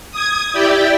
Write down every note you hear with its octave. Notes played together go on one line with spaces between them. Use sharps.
D#6 G#6
E4 G4 D5 G5